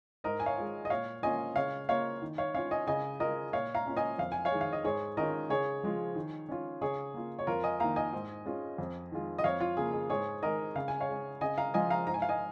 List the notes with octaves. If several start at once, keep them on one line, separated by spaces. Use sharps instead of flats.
G#2 A#4 D#5
G#5
C#5 F5
G#3 F4
D#5
A#2 C#5 F5
A#3 C#4 F4 D#5 G#5
C#3 C#5 F5
A#3 F4 C#5 F5
D#3
C#5 F5
C#4 F4 C#5 F5
D#5 G#5
C#3 D#5 G#5
G#3 F4 A#4 D#5
A#2 C#5 F5
F5 A#5
A#3 C#4 F4
D#5 G#5
F2 F5
G#5
C#5 F5
D#3 G#3
F5
D#5
G#2 G#4 C#5
D#3 C#4 F4 A#4 D#5
C#3 G#4 C#5
F3 G#3 F4
D#3
C#4 F4
C#3 G#4 C#5
A#3 F4
C#5
F2 F4 A#4
D#5 G#5
D#3 A#3 F5 A#5
D#5 G#5
G#2
G#3 C#4 F4
F2
D#3 G#3 F4
D#5
F2 C#5 F5
F4
C#3 A#3 G#4
G#4
G#2 G#4 C#5
D#3 G#3 A#4 D#5
C#3 F5
G#5
C#5 F5
G#3 C#4
C#3 D#5 G#5
F5 A#5
F3 G#3 F4 D#5 G#5
F5 A#5
G#2 A#5
G#5
F5
D#5 G#5